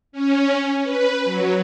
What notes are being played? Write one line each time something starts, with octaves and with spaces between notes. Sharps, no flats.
C#4
B4
F#3